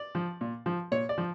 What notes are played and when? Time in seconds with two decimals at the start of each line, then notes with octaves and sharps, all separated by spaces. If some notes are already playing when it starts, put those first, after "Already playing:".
Already playing: D5
0.15 F3
0.41 A#2
0.66 F3
0.92 A#2 C#5
1.09 D5
1.18 F3